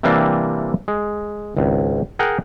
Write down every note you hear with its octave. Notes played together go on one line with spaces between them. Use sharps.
C3 E3 G3 A#3 C4 D4
G#3
G#1 C#2
G#4 A#4 F#5 G5